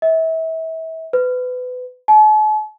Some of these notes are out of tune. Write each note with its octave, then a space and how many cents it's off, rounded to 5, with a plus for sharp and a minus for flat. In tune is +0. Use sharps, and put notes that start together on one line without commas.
E5 -35
B4 +25
A5 -45